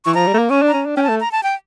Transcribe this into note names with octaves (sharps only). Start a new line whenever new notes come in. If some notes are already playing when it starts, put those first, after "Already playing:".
E3 C#6
F3 A#5
G3
A3
A#3
C#4 C#6
D4
A#5
C#4
D4
C#4 G5
A5
A3
A#5
A5
G5